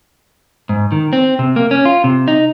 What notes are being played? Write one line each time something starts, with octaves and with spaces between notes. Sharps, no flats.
G#2
D#3
C4
C3
A#3
C#4
F4
C3
D#4